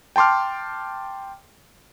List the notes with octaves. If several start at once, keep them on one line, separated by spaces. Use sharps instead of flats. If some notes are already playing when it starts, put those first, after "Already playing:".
G5 A5 C6 D6 F6